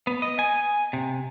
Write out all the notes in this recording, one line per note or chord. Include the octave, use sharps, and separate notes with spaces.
B3
D#5
G#5
C3